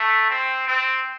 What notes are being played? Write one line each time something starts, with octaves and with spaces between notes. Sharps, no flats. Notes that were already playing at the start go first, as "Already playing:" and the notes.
Already playing: A3
C4
C4